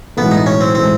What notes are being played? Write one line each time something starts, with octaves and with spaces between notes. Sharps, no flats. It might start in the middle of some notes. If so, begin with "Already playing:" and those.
B1 A2 E3 G#3 B3
D#4
C#4
C4
A2 E3 G#3 C4